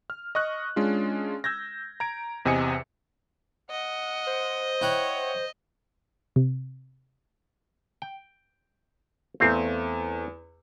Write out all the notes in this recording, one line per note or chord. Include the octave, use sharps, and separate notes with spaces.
F6
D#5 C#6 F#6
G#3 C#4 D4 F4
E6 G6 G#6 A#6
A#5 G#6 D7
E2 C3 D#5 G#5 D#6 C#7
D#5 F#5
C5
E4 C#5 F#5 G5
C3
G5
E2 A3 C4 F5